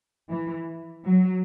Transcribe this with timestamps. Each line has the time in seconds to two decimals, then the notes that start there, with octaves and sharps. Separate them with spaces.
0.29 E3
1.05 F#3